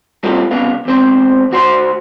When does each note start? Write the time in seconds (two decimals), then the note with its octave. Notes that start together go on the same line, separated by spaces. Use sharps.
0.23 G3 A3 A#3 C4 F4 F#4
0.51 C2 C#3 B3 F5
0.85 E2 G#2 C4 C5
1.51 D2 F#4 C5 C6